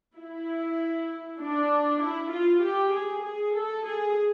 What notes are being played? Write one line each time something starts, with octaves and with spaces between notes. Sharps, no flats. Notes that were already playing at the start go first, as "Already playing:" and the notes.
E4
D4
E4
F4
G4
G#4
G#4
A4
G#4